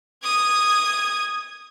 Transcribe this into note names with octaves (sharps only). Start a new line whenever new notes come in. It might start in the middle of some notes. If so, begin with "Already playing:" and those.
D#6 G#6